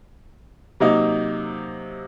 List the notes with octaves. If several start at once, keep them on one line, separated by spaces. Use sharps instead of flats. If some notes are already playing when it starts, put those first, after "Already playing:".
C3 F#3 A#3 D#4